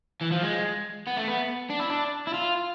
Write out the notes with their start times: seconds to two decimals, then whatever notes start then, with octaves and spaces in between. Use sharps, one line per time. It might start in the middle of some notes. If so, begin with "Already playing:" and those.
0.21 E3
0.32 F3
0.43 G#3
1.07 B3
1.17 A3
1.28 B3
1.70 D4
1.80 E4
1.90 D4
2.27 E4
2.34 F4